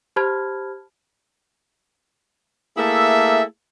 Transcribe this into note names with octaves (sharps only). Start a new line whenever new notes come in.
G4 C5 A5 B5 F6 G#6
A3 A#3 E4 G#4 A4 E5